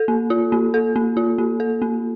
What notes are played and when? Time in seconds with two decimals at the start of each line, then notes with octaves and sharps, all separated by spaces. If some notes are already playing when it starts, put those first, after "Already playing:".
Already playing: A4
0.08 A#3
0.30 F4
0.52 A#3
0.74 A4
0.96 A#3
1.17 F4
1.38 A#3
1.60 A4
1.82 A#3